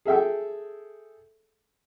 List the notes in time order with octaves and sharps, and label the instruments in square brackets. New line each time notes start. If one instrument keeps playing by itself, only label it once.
[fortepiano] G#4 A4 E5 G5